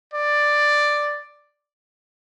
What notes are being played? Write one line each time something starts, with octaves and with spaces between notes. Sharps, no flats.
D5